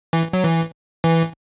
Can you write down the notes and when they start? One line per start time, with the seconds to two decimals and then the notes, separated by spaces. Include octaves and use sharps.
0.13 E3
0.33 F#3
0.43 E3
1.04 E3